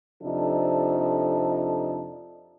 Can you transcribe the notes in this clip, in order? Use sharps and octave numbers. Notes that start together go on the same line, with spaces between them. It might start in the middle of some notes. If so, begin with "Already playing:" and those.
F2 C3 F3 D4 D#4 A4